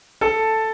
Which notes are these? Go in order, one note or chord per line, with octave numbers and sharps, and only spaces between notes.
A4 A5